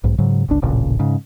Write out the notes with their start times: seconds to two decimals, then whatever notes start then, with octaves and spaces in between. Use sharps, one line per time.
0.04 B1 G#2
0.18 G#2 C#3 F#3
0.48 G1 C#2 D4
0.62 D1 A1 A#2 C#3
0.99 G#2 C#3